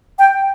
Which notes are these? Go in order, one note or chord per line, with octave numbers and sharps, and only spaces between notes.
G5